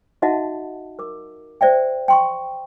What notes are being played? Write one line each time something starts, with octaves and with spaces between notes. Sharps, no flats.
D#4 F#4 D#5 E5 F#5 A5
A#4 D6
C5 D5 E5 G5
G5 C6 C#6